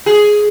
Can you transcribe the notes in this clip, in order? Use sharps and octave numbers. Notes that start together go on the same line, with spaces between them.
G#4